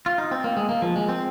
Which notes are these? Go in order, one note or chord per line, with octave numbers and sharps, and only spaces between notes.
F4
D#4
C4
A#3
G#3
A#3
F3
G#3
C4